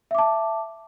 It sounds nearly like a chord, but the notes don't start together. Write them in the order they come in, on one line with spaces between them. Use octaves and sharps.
E5 D6 A5